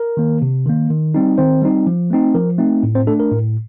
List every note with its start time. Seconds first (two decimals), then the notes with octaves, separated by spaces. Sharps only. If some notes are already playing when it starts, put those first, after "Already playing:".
Already playing: A#4
0.17 D#3 A#3
0.42 C3
0.66 D#3 A#3
0.90 D#3
1.14 G3 C4 D#4
1.38 D#3 C4 C5
1.62 G3 C4 D#4
1.87 F3
2.10 A3 C4 D#4
2.35 F3 A#4
2.58 A3 C4 D#4
2.83 A2
2.95 C4 C5
3.07 A3 D4 A4
3.20 A#4
3.32 A2